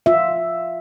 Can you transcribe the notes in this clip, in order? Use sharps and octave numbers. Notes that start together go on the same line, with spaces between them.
F4 E5